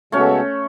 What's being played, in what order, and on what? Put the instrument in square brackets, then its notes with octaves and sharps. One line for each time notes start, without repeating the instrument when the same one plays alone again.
[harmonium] C#3 G#3 B3 F#4 A4 [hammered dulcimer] A3 C#4